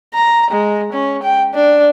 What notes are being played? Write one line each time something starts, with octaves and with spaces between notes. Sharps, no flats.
A#5
G#3
C#4
G5
D4